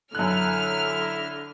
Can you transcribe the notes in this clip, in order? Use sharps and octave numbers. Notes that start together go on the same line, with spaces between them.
F#2 D3 E4 F6 F#6